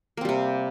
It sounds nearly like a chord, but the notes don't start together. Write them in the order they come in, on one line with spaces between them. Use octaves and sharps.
A#3 C4 G3 C3